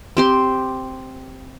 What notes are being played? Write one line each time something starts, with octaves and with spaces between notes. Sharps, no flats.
C4 G4 C6